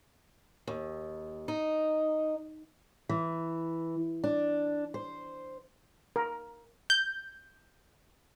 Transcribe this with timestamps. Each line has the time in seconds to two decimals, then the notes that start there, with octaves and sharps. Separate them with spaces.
0.67 D#2
1.48 D#4
3.09 E3
4.24 D4
4.94 C5
6.16 A#4
6.90 G6